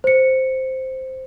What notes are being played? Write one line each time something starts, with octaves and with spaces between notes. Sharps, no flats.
C5 C#7